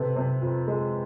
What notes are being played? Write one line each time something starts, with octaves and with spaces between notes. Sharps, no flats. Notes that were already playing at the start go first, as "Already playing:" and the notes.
Already playing: C3 A4 B4
C3
F2
G#3